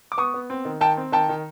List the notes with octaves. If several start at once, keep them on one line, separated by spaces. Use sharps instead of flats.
D6
B3 C#6 D#6
B3
C4
D#3
D#3 G5 A5
C4
D#3 G5 A5
D#3